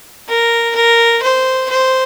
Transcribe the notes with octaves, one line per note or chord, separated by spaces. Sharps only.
A#4
A#4
C5
C5